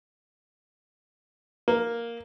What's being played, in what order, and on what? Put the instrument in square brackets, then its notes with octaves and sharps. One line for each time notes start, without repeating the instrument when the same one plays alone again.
[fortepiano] A#3